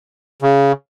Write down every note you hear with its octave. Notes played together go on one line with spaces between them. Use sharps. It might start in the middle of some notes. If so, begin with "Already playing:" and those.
C#3